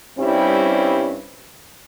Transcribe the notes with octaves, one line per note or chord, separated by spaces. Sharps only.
G2 G3 C4 C#4 E4